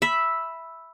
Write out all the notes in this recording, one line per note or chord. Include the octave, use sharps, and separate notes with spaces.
E5 B5